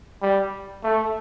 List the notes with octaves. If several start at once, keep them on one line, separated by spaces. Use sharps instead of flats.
G3
A3